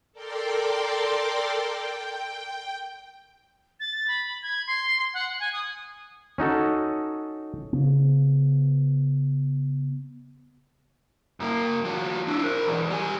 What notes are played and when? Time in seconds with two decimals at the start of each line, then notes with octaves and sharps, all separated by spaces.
0.13 A4 A#4 D5 G5 C6 D6
1.62 G5
3.80 A6
4.08 B5
4.43 G#6
4.67 C6
5.14 F#5
5.40 G#5
5.53 D#6
6.38 C#4 D#4 F#4 A4
7.73 C#3 B3
11.40 F#2 A#3
11.85 F3 F#4
12.27 D4 E4
12.44 A#4 C5
12.65 B1 E2
12.90 G3 G#5